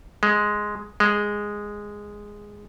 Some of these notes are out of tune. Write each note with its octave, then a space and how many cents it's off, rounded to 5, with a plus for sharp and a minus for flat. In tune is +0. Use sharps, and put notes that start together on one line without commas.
G#3 +5
G#3 -5